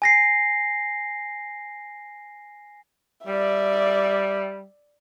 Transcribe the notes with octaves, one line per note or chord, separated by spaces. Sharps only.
G#5 A#6 C7
G3 D5 E5